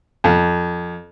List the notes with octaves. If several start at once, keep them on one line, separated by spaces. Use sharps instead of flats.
F2